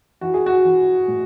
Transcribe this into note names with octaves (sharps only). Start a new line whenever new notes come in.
E3 F#4
G#4
F#4
E3
A2